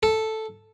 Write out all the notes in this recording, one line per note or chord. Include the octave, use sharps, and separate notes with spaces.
A4